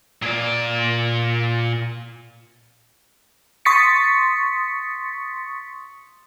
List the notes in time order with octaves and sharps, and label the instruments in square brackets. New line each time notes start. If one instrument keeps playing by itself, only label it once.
[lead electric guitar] A#2 D5
[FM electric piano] C6 C#6 D#6 A6 B6 C#7